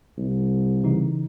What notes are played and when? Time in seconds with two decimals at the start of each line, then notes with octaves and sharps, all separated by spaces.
0.18 C2
0.84 C#3 E3 D#4